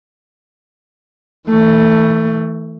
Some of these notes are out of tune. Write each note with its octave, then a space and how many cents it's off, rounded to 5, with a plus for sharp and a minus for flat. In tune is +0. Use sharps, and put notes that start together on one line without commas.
E3 -25 A3 +20